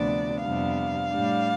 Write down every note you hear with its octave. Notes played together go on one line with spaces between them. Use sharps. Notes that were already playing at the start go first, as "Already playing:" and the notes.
Already playing: D2 C3 F3 B3 D4 D5
F2 C3 G3 B3 D4 F5
A2 G3 D4